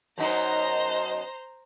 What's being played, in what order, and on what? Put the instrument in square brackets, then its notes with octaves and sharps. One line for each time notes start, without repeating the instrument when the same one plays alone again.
[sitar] F#2 B2 D#4 [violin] C5 A#5